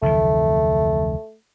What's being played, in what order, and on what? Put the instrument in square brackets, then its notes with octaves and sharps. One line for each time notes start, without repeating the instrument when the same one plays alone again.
[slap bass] F1 D2 E3 [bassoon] A3